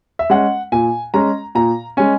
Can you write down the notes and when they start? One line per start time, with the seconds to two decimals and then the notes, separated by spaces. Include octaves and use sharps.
0.19 E5
0.30 G#3 C#4 F#5
0.72 A#2 G#5
1.14 G#3 C#4 A#5
1.55 A#2 A#5
1.97 G#3 C#4 G#5